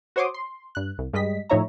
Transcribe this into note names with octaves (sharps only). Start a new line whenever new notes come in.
F#4 C5 C#5 C6 D6 D#6
C6
G2 F#6
C2
G2 G3 G#3 D#5 B6
A2 F3 D#4 C#5 E5 A#5